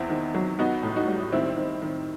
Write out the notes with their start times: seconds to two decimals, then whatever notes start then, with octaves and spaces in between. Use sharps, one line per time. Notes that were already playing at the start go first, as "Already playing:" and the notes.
Already playing: E2 C4 E4
0.10 D#3
0.34 F#3
0.59 B3 D#4 F#4
0.83 A2
0.96 D#4 F#4
1.08 G3
1.32 D#3 C4 E4
1.57 D#3
1.82 D#3